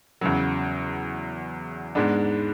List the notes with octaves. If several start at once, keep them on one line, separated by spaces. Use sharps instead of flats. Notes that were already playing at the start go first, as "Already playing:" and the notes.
E2 C#3 F#3
G#2 G#3 B3 D4